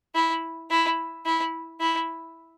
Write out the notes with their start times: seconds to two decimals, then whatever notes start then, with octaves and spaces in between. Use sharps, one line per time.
0.15 E4
0.70 E4
1.25 E4
1.80 E4